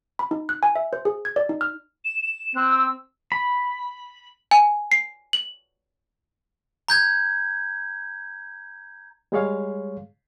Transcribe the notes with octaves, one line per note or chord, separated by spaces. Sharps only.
B5
D#4
F#6
G#5
E5
C5
G#4
G#6
D5
D#4
F6
E7
E7
C4 F#6
E6
B5
G#5
C7
F#7
A#5 G6 G#6
G3 G#3 G#4 C#5 F5